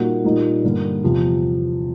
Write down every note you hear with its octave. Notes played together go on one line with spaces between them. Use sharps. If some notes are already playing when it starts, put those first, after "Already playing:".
Already playing: A#2 G3 A#3 D#4 F#4
A#2 G3 A#3 D#4
G2 D3 G3 A#3
E2 C3 F3